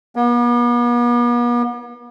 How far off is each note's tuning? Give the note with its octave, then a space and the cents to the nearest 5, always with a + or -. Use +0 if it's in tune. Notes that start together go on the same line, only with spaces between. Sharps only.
B3 -45